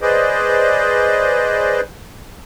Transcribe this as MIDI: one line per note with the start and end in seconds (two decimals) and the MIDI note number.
0.01 1.81 68
0.01 1.81 71
0.01 1.81 72
0.01 1.81 74
0.01 1.81 75